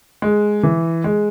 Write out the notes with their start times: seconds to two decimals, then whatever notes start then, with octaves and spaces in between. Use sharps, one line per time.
0.22 G#3
0.63 E3
1.04 G#3